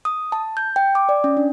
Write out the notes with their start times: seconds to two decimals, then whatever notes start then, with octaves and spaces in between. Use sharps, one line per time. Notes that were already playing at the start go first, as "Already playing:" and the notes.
0.05 D#6
0.32 A5
0.57 G6
0.76 G5
0.95 D6
1.09 D5
1.24 C#4
1.37 D4